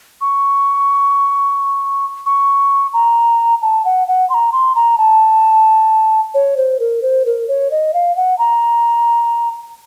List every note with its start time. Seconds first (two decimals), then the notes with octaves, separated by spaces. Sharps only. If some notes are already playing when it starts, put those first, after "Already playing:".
0.21 C#6
2.26 C#6
2.93 A#5
3.62 A5
3.85 F#5
4.08 F#5
4.30 C6
4.34 A#5
4.52 C6
4.75 A#5
4.98 A5
6.34 C#5
6.57 C5
6.80 A#4
7.02 C5
7.26 A#4
7.48 C#5
7.71 D#5
7.94 F5
8.16 F#5
8.39 A#5